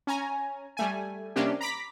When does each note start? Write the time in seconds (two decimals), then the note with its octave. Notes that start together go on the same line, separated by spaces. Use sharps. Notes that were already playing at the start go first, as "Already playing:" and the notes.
0.07 C#4 G#5 A#5
0.77 G3 A3 G#5
1.36 C3 G3 A#3 C#4 D4 G4
1.61 A#5 B5 D6 B6